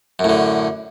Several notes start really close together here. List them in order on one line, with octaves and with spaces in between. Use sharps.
F#2 A2 D3